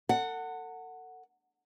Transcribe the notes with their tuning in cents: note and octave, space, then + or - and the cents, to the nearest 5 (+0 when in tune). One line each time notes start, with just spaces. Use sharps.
A4 +40 F#5 +0